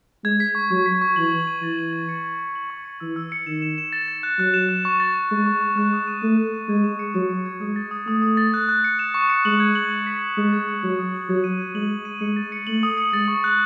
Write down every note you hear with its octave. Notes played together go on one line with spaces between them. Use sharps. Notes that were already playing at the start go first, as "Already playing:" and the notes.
G#3 G#6
B6
C#6
F#3 C#6
B6
C#6
E3 F#7
F#7
D#7
E3 A6
F#7
A6
C#7
G#6
C#7
F#7
C#6
C#7
E3 E6
E6
C#7
D#3 E7
E7
E7
A6
A6
F#6
F#3 F#6
E7
F#6
C#6
A6
A6
G#3 C#6
C#6
C#6
G#3 F#6
D#6
D#7
A3 D#7
F#6
D#7
G#3 G#6
E7
C#7
F#3 C#7
C#7
G#6
G#3 D#6
A6
D#6
A3 D#6
D#6
A6
F#6
F#6
C#7
E7
C#6
C#7
G#3 F#7
G#6
F#7
F#7
B6
G#6
G#3 D#6
G#6
C#7
F#3 C#7
D#6
F#7
F#3 G#6
D#7
G#6
G#3 F#7
D#7
D#7
G#3 C#7
A6
C#7
A3 F#7
D#6
C#7
G#3 A6
C#6
F#6